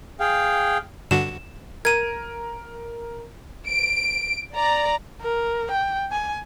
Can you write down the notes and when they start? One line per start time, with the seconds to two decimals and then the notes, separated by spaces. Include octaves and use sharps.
0.20 G#4 F5 G5
1.11 G2 D3 F#4 E7
1.85 A#4 G#6 D#7
3.68 D7
4.55 D5 A#5
5.21 A#4
5.71 G5
6.12 G#5